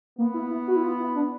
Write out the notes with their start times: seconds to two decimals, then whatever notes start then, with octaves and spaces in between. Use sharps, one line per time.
0.18 A#3 B3
0.34 E4
0.51 E4
0.68 F#4
0.76 E4
0.84 F4
0.99 E4
1.16 D4